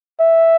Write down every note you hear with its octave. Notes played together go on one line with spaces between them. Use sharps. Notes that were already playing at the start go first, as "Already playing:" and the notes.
E5